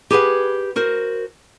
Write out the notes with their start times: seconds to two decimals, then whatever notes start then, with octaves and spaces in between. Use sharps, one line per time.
0.11 G4 G#4 B4 F#5
0.76 F#4 A#4 C5